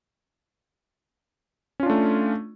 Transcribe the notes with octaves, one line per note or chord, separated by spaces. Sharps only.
A3 C#4 D4 F4